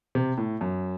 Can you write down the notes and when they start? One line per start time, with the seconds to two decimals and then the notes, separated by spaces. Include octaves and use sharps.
0.15 C3
0.37 A2
0.61 F#2